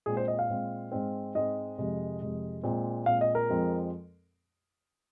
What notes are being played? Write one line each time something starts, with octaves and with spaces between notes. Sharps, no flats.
A#2 G#3 C4 G#4
C5
D#5
F5
A#2 G#3 C4
G#2 G#3 C4
G#2 G#3 C4 D#5
F2 C3 G#3
F2 C3 G#3
A#2 G#3 C4
A#2 G#3 C4 F5
D#5
A#4
F2 F3 G#3 C4